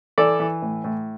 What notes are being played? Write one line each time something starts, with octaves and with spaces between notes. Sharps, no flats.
E3 A4 D5
E3
A2
A2